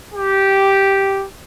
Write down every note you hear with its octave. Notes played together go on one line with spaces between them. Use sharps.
G4